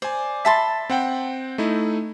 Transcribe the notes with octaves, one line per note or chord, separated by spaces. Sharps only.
C5 D5 G#5
E5 A5 B5 C6 A6 B6
C4 F#5 G5
A3 D#4 E4